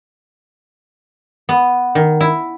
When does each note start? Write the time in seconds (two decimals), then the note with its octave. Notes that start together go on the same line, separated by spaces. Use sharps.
1.49 B3
1.95 D#3
2.21 E4